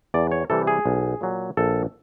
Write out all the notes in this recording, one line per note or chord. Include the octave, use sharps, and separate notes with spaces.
E2 D5
C#5
C3 E3 G3 A4
G#4
B1
A#2 F#3
A#1 A4